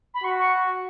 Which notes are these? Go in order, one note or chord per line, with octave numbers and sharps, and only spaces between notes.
B5
F#4 C#6
C#6